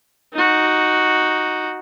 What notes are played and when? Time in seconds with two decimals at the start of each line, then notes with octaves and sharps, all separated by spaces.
0.33 D#4 F#4